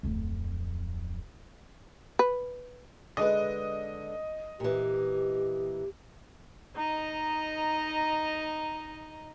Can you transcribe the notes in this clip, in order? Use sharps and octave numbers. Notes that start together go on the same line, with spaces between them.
D1 F2
B4
D3 G#3 B4 D#5
A#2 E3 G4
D#4 D#5 A#5